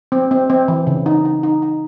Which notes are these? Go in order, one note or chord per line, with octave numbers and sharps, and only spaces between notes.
C4
C4
C4
E3
C#3
D#4
D#4
D#4
D#4